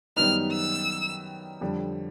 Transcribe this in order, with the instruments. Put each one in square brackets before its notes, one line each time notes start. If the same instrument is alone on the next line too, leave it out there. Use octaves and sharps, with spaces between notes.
[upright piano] F#2 D#3 G3 B3 D#4 [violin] F6
[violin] E6
[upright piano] F2 D3 G3